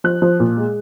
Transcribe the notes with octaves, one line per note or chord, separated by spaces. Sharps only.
F3 F#6
F3
A#2
G#3